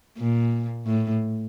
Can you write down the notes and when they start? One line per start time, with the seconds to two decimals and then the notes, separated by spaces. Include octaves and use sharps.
0.17 A#2
0.86 A2